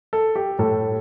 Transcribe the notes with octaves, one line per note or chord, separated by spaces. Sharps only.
A4
G4
A2 A4